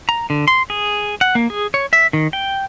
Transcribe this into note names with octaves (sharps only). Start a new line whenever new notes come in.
A#5
D3
C6
G#4
F#5
A#3
G#4
C#5
E5
D#3
G5